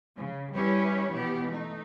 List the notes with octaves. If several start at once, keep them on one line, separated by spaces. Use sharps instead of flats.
C#3
G3 C#4 E4 G4 B4 C#5
B2 E3 B3 G4
A3 D#4